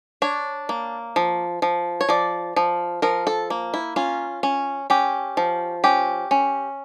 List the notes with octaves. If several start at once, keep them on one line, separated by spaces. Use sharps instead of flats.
D4 C#5
A#3
F3
F3
C#5
F3 D5
F3
F3 A#4
A4
A#3
E4
C#4 F4
C#4
C#4 G4
F3
C#4 G4
C#4